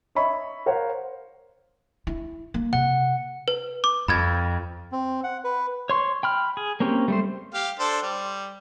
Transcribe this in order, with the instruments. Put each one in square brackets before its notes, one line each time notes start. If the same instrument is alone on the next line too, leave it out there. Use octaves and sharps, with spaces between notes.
[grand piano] C#5 D#5 E5 B5 C#6
A#4 C5 C#5 F5 F#5
[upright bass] E4
A#3
[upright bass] C3 [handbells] F#5
[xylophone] B4
D6
[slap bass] F2 [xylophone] B5 G#6
[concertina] C4
F#5
B4
[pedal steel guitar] C#5 C6 C#6
G5 B5 F6
G#4
A#3 C4 C#4 G4
G3 A3 C5
[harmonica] G4 F5
D4 A4 C5
G3